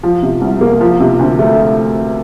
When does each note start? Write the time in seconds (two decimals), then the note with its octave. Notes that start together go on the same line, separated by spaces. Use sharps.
0.03 F3
0.23 C3
0.41 C2
0.61 A#3
0.81 F3
1.00 C3
1.19 D2
1.39 A3